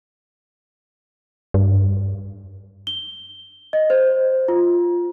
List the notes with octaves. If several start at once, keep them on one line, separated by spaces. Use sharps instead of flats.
G2
G7
D#5
C5
F4